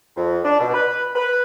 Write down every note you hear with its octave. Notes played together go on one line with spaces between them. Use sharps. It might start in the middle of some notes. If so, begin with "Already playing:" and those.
F2
D4
B2
B4
B4